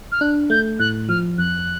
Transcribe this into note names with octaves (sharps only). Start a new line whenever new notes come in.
F6
D4 F#6
A3 G6
A2 F#6
F3 F6
F2 F#6